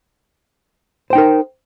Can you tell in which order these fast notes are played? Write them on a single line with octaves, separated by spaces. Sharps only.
C5 G5 D#4 A#4